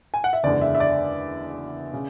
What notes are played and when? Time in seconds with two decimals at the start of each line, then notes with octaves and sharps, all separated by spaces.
0.14 G#5
0.24 F#5
0.33 E5
0.43 F#1 E2 D3 G#3 D5
0.61 E5
0.75 E5
0.80 D5
1.94 C#3